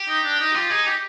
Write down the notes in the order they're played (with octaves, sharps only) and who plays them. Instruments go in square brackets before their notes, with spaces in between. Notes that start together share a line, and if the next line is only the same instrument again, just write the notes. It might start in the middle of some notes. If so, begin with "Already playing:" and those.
Already playing: [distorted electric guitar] G4
[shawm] D#4
D4
D#4
[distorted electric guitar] F4 [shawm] G4
[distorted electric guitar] D#4 [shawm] G#4
[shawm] G4